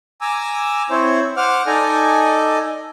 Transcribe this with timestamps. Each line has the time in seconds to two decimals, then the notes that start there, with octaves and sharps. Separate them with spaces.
0.21 G#5 A#5 D6 E6
0.90 C4 E4 C5 C#5
1.37 C5 F#5 D6 F6
1.66 D#4 A4 D5 D#5 G#5